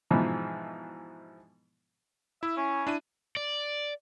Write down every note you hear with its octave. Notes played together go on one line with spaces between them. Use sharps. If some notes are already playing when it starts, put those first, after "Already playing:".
G#2 B2 E3 F3
E4 E5
C#4
D4 E4 D#7
D5